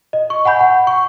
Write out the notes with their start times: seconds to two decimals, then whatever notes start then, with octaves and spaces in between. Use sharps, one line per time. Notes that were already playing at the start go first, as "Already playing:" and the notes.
0.13 D#5
0.30 C#6
0.45 F#5 G#5 B5 G6
0.61 F#5
0.87 C#6